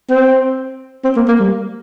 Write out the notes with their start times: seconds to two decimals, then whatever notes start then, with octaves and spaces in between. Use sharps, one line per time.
0.10 C4
1.04 C4
1.16 A#3
1.28 A#3
1.40 G3